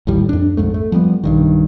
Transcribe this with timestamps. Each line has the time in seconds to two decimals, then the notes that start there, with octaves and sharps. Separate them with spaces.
0.07 A1 D#2 A2 G3
0.29 F2 D4
0.57 B1 F2 G#2 A3
0.74 A3
0.92 F3 G3 A#3 B3
1.24 B1 G2 D#3